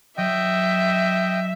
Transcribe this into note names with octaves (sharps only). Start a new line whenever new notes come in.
F#3 D#5 E5 G5